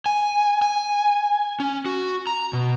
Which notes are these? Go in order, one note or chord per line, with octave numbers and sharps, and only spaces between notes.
G#5
G#5
C#4
F#4
A#5
B2